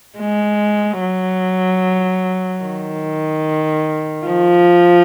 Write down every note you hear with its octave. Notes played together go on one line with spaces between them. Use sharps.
G#3
F#3
D#3
F3